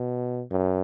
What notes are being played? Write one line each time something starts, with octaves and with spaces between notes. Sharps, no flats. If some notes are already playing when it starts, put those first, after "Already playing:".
Already playing: B2
F#2